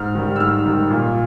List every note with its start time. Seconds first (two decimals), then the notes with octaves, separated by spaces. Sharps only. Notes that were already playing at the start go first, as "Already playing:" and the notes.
Already playing: G#2 F6
0.15 D#3 G3
0.36 E6
0.40 G#2 F6
0.66 D#3 G3
0.91 A#2